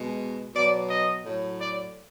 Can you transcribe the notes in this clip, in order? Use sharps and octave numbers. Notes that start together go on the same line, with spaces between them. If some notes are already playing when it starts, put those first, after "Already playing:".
Already playing: B2 G#3
B2 F#3 D5
D#5
A2 F#3
D5